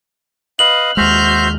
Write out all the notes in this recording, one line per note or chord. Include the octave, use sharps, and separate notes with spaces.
B4 D#5 F5 F#7
D#2 G#3 F#4 C5 E5 F6 G6